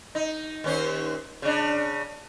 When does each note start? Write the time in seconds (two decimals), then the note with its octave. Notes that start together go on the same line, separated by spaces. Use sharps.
0.15 D#4
0.64 D#2 C#4 C5
1.42 C#3 D4